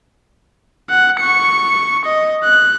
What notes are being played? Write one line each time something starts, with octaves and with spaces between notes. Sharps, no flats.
F#5
C#6 C#7
D#5
F#6